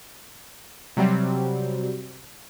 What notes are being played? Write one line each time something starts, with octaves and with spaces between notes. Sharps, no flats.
C3 F#3 G3 C4